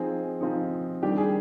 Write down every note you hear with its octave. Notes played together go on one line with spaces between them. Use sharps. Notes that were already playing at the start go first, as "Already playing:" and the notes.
Already playing: F3 C4 D#4 G#4
F3 C4 D#4
D#3 G3 D4 G4
G#4